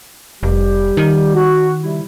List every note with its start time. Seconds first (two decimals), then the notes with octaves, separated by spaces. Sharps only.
0.43 F1 G3 G4
0.97 D#3
1.35 F#4
1.82 C3 G3 E4